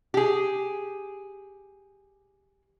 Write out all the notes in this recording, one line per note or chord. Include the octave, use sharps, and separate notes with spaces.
G4 G#4